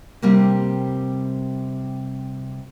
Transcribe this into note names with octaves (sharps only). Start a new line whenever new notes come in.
C3 G3 A#3